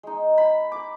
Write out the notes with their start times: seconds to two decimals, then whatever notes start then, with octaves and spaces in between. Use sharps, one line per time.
0.03 G#3 D#4
0.38 B5
0.72 D6